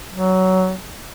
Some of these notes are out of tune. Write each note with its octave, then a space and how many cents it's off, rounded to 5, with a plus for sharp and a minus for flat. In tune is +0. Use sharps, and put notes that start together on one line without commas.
F#3 +15